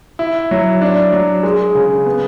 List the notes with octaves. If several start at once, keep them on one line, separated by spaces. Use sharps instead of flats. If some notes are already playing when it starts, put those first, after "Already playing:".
E4
F#3
D4
F#3
G#3
C#3
B3